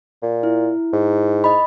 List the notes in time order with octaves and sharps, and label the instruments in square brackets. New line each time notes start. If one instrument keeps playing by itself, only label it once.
[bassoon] A#2
[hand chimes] E4
[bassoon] G#2
[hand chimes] D#5 B5